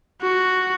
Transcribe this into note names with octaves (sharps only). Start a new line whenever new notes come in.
F#4